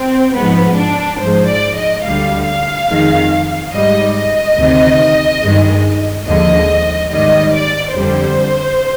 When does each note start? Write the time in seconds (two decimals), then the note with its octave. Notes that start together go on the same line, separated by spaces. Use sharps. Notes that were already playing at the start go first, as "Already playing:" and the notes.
Already playing: C4
0.35 G#2 F3 G#3 B3
0.77 D4
1.20 G#2 F3 G#3 C5
1.48 D5
1.76 D#5
2.04 D2 D3 G3 F5
2.46 F5
2.89 F2 D#3 G#3
3.73 G#2 G3 D#5
4.16 D#5
4.58 D2 C3 D#3
5.42 G2 D#3 G#3
6.26 D#2 D3 F3 G#3 D#5
7.10 G#2 D#3 G3 D#5
7.54 D5
7.95 F2 D3 G3 C5